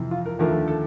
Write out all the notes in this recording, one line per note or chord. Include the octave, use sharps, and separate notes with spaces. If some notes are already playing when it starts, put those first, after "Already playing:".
Already playing: F2 C3 E3
F4
A#4
D#2 D3 F3 A3 A#4
A4